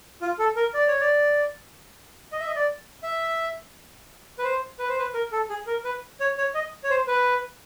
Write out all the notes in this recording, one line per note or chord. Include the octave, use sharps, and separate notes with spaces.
F4
A4
A#4
D5
C#5
D5
D#5
E5
D#5
D5
E5
B4
C5
B4
C5
B4
A#4
A4
G#4
A#4
B4
C#5
C#5
D#5
C#5
C5
B4